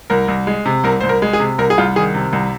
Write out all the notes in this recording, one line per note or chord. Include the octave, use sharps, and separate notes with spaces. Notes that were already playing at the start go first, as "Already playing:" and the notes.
C2 A#4
C2
G#3
C3
C2 A#4
C2 C5
A#4
G#3
G#4
C3
C2 A#4
G#4
C2 F4
D#3 G#4
C3
C2